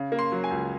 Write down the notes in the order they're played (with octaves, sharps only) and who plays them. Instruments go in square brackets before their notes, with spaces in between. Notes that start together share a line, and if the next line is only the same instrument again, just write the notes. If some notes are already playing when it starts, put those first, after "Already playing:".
Already playing: [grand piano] C#3
A#3
C6
F#3
G#5
C#2